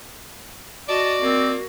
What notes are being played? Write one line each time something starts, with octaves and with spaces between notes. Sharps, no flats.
F#4 D5 D#5 A5
A#3 C4